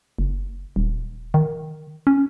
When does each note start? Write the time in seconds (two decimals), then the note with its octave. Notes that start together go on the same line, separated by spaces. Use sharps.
0.19 F#1
0.76 D#1
1.34 D#3
2.07 C#4